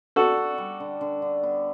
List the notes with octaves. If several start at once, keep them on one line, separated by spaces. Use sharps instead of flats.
D4 F#4 A4
D4
G3
D3
D3
D3
B3